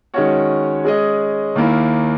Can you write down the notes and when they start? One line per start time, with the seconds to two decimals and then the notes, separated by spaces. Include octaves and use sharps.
0.14 D#3 G#3 C#4 F#4 C#5
0.85 G#3 C#4 G#4 D#5
1.56 D#2 D#3 A#3 E4